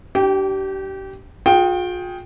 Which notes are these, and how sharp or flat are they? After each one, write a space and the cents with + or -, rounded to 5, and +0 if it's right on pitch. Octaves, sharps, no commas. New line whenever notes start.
D4 +0 G4 -30 G5 +0
F4 +45 G#4 +5 G5 +0